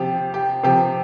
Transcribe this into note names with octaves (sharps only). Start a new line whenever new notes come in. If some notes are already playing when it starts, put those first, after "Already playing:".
Already playing: C3 F3 G4
G4
C3 F3 G4